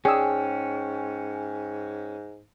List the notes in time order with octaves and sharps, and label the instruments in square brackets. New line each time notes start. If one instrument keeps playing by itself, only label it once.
[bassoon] G#2 [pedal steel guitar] C#4 [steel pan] G#4 D5 E6 [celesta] G5